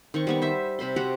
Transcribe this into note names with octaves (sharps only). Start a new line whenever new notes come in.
D#3 C4 C#6
G3 B3 C#6
C5 E5
C3 C5 B5 C6
F#4 G4 C5 F#5